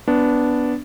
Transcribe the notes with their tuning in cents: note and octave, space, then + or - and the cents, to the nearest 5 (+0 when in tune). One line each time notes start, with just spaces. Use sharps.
B3 +0 D4 -10